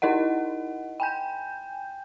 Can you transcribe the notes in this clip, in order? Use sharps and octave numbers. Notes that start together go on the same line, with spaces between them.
D#4 E4 A#4 D#5 F#5
G5 G#5 G6